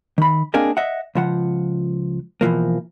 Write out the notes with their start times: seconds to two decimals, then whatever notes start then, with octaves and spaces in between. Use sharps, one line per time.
0.18 D#3 B5
0.54 A#3 C4 D4 G#4 A#4 D#5
0.77 D#5 E5 F#5
1.15 C#2 F3 F#5
2.41 B2 E3 F3 A#3